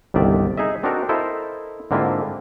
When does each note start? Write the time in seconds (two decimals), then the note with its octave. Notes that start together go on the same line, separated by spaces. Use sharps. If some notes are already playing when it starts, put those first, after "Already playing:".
0.14 G1 C2 D#3 D5 E5
0.57 D#4 G#4 D#5 E5
0.83 C4 D4 D#4 F#4 A4 A#4
1.09 E4 A4 A#4 C5 D#5 F5
1.91 G#2 D3 A#3 C4 E4 F4